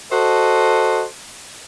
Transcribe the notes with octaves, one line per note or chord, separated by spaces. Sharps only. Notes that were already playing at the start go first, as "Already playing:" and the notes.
F#4 A4 C5 D#5